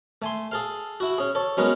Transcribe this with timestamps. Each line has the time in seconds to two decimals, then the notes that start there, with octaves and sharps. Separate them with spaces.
0.22 A3 G#5 C6
0.52 G#4 A4 F5
1.00 E4 F#4
1.18 C#4 G#4
1.35 A4 C#5
1.57 F#3 G#3 B3 C#4 A#4 B4